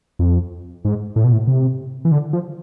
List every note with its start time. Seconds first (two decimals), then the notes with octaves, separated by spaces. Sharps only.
0.19 F2
0.85 G#2
1.16 A2
1.24 B2
1.32 A2
1.47 C3
2.05 E3
2.12 D3
2.33 F3